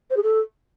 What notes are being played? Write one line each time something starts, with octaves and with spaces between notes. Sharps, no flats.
C5
G#4
A4